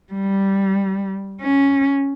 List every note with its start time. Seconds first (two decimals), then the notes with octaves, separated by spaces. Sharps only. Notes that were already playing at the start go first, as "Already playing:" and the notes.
0.13 G3
1.41 C#4